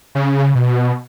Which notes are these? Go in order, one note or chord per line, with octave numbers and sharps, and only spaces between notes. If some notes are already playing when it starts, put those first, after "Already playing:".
C#3
B2